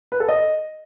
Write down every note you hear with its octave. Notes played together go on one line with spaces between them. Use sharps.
B4
A4
D#5